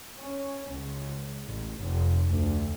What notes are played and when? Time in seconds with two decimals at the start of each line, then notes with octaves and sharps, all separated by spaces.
0.19 C#4
0.67 C#2
1.46 A1
1.80 F1
2.29 D2